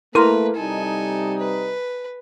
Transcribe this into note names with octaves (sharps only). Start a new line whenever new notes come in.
A3 A#3 E4 A#4 B4 A#5 C6
C3 G3 D#4 A4 G#5
B4